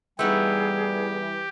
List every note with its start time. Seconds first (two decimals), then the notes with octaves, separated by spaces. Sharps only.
0.19 E3 G3 A3 B3 D#4 G4 G#4